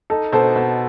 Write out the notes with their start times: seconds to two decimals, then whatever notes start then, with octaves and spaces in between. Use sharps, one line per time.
0.10 D#4 A4
0.32 B2 A4 C5
0.56 B2